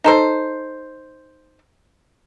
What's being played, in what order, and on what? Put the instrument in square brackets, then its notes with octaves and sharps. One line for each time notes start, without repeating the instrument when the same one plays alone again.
[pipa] D#4 A4 C5